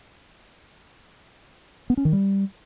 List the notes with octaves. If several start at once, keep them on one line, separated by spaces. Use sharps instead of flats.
B3
C#4
D#3
G3